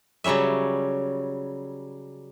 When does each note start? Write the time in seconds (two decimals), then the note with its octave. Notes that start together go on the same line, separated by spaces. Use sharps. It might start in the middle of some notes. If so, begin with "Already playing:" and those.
0.24 C#3 F#3 G3 C#4 E5